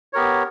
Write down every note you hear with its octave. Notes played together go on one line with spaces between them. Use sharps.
B3 G4 A#4 C#5